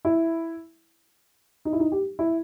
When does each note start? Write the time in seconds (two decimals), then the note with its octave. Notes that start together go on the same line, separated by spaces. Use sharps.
0.05 E4
1.65 D#4
1.73 E4
1.80 D#4
1.92 G4
2.19 E4